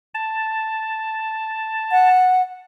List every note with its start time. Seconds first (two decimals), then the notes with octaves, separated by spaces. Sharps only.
0.14 A5
1.91 F#5